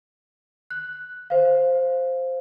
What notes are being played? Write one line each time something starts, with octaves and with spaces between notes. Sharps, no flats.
F#6
C5 F5